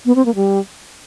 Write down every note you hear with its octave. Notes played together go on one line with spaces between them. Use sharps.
B3
C4
A#3
G3